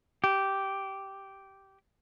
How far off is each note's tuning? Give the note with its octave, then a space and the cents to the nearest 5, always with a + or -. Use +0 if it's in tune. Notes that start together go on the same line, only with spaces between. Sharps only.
G4 -10